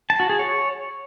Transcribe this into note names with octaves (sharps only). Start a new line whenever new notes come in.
A5
F#4
G#4
C#5